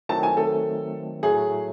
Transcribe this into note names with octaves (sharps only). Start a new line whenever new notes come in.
D#3 F#3 A3 C4 A5
G#5
A4
A2 F#3 A3 G#4